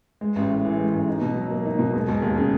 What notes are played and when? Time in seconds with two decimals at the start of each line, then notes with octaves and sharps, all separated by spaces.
0.21 G#3
0.36 A1
0.50 A2
0.65 E3
0.79 G#3
0.94 A1
1.08 D#4
1.21 B2
1.36 F#3
1.50 A#3
1.65 D#4
1.79 B2
1.94 E1
2.09 E1
2.22 D#2
2.37 C#3